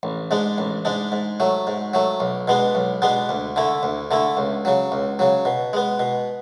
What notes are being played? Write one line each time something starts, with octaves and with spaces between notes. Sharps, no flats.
A1
G#2 G#3 D4
A1
G#2 G#3 D4
G#2
F#3 A3
G#2
F#3 A3
B1
B2 G#3 B3 D4
B1
B2 G#3 B3 D4
D2
D3 A3 E4
D2
D3 A3 E4
C#2
C#3 F#3
C#2
C#3 F#3
B2
G#3 B3
B2